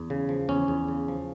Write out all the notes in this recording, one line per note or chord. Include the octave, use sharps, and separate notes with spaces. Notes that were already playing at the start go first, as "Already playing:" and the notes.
Already playing: E2
C#3
F3
E2 C#4
E2
C#3
F3